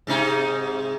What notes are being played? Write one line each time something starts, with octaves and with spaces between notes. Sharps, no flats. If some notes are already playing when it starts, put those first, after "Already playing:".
G#2 C3 D#4